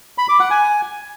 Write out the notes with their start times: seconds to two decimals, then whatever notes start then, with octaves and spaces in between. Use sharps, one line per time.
0.18 B5
0.29 D6
0.40 F#5
0.50 G#5